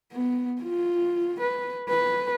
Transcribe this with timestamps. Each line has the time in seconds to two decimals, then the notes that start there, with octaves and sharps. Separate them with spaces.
0.13 B3
0.62 F4
1.41 B4
1.90 B4